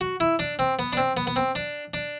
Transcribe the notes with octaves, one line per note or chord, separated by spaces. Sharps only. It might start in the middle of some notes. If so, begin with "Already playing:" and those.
F#4
E4
D4
C4
B3
D4
C4
B3
B3
C4
D4
D4